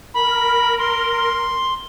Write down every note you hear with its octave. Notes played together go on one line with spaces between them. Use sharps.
A#4 B5
C6